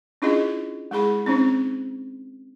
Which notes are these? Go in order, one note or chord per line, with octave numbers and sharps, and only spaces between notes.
C#4 D4 E4 F4 G#4 D#5
G#3 E4 G#4 B5
C4 C#4 D#4 C5